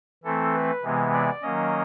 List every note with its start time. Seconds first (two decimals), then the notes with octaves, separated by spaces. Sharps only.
0.24 E3 A3 C4 A4
0.54 B4
0.83 C3 E3 G#3 B3
1.13 D5
1.42 D#3 F#3 A#3 C#4 D#5